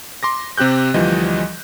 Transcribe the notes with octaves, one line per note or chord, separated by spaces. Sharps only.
C6 D6 A#6
C3 C4 G4 F#6 G6
D2 E3 F3 G3 D#5